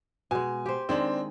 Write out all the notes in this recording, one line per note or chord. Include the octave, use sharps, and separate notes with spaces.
B2 G#3 G#5
G4 C5
D#3 G#3 C4 D4